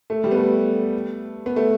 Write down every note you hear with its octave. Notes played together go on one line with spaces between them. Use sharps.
A3
G3
B3
A3
B3
A3